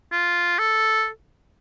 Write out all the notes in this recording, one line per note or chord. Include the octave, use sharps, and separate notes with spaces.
F4
A4